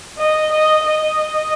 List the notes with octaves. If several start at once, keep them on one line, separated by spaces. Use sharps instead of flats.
D#5
D#5
D#5